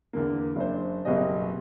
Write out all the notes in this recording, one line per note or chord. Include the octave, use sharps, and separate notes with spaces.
E2 D3 A#3
F#1 D4 C5
F#1 B2 G3 G4 D#5